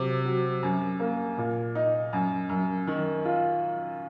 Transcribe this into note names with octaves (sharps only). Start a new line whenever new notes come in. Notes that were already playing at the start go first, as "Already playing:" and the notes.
Already playing: C3 F#3
F#3
F#2
A#3
A#2
D#4
F#2
F#2
D#3
F4